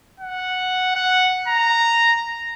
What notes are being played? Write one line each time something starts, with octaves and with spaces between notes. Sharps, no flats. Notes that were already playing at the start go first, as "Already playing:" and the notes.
F#5
F#5
A#5